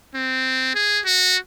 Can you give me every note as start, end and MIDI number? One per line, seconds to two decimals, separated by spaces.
0.15 0.72 60
0.75 0.99 68
1.05 1.36 66